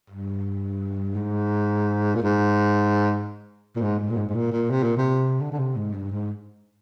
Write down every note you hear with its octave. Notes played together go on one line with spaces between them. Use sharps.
G2
G#2
A#2
G#2
A#2
G#2
G#2
A#2
G#2
G#2
A#2
A#2
C3
A#2
C3
D3
D3
C3
G#2
G2
G#2